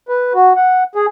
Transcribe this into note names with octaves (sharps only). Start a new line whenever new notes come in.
B4
F#4
F#5
G#4